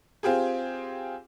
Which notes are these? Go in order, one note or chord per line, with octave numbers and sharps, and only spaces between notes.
C4 F4 G4 G#4